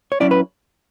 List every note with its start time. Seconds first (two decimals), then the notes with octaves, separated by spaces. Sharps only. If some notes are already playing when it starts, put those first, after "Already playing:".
0.12 C#5
0.20 F#3 C#4 E4 D5
0.31 B4